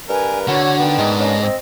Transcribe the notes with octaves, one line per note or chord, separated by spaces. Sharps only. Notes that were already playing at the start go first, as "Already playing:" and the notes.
G2 A#4 B4 G#5
D3 F#4 C#5
D#3 B3 D4 G5
G#2 G#3
C#4 D#5
C4